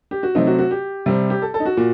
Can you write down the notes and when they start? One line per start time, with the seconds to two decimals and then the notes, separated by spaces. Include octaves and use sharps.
0.11 G4
0.23 F#4
0.35 C3 F#3 A3 C4 D#4
0.47 F#4
0.59 F#4
0.71 G4
1.06 C3 G3 C4
1.30 G4
1.42 A4
1.54 A4
1.60 D#4
1.66 F#4
1.77 A#2